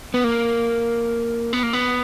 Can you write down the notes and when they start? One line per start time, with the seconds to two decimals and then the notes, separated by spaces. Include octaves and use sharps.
0.14 B3
0.24 A#3
1.53 B3
1.63 A#3
1.73 B3